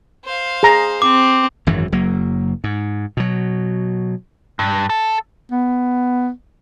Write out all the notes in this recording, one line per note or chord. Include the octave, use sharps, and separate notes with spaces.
C5 F5
G#4 A#5
C4 D6
G#1 F#2 E3 F#3
F#1 F#3 A#3
G#2
B2 F#3
G2
A4
B3